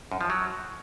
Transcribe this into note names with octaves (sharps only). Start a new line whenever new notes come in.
F#2
F3
F#3